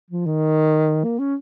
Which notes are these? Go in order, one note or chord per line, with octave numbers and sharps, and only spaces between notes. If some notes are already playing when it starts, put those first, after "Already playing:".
F3
D#3
A#3
C#4